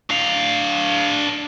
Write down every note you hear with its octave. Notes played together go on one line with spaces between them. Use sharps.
D4 F5